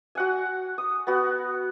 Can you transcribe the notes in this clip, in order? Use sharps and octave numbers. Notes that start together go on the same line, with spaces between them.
F#4 F#5 G#5
D#6
B3 F#4